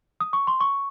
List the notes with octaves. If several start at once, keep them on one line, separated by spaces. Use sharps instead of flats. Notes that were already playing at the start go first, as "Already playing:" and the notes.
D#6
C#6
C6
C#6